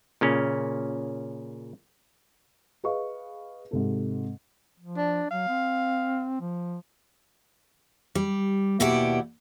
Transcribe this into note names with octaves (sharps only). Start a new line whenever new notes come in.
A#2 C#3 C#4
G#4 B4 D#5 F5 C#6
G#2 C3 A4
F3
D4
F#3 F5
C4
F3
G3
D#2 B2 E4 G4 D5 F#5